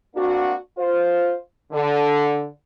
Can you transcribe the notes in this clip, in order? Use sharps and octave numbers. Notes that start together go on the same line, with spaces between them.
A#3 C4 D4 F#4
F4 C5
D3